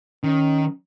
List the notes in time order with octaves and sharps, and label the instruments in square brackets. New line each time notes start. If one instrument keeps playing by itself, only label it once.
[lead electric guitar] D#3 [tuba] C#4